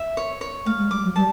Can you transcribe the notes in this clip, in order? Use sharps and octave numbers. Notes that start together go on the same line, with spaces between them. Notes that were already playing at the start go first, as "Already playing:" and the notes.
Already playing: E5
C#5
C#5
A3 F5
G#3
G3 D6
F#3
G3 A5